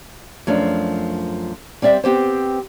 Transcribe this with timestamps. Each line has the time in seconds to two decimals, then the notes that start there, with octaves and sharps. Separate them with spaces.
0.47 F#2 F3 A3 D4
1.82 G3 C4 D5 E5
2.04 B3 C4 G4 C5